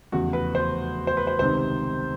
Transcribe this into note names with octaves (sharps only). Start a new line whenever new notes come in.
F1 E2 C#3 F#4
B4
C5
C5
B4
C5
C#2 C3 D#3 C5